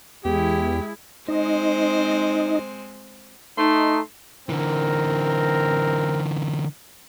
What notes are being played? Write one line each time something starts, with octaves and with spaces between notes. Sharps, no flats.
E2 G#3 E4 G4
G#3 C4 D#4 C5 D#5
A3 D#4 C6
D3 E3 C4 A#4